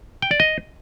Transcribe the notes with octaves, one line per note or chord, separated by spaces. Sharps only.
G5
D5
D#5